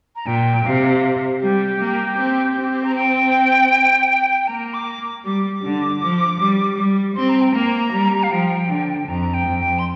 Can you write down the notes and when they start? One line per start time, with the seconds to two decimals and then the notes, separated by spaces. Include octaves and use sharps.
0.16 A#5
0.26 A#2 G5
0.65 C3 F5
1.41 G3 G4
1.80 A#3
2.17 C4
2.56 C4
2.83 A#5
2.95 G5
4.44 G5
4.47 A#3 A#5
4.74 D6
5.25 G3 D6
5.52 D6
5.63 D3
6.02 F3
6.40 G3
6.77 G3
7.16 C4 C6
7.29 A#5
7.41 G5
7.53 A#3 A#5
7.92 G3
8.23 F5
8.31 F3 G5
8.69 D3
9.08 F2 A#5
9.33 G5
9.46 F2
9.59 G5
9.79 C6